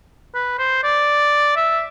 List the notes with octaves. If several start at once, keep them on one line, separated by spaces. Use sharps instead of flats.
B4
C5
D5
E5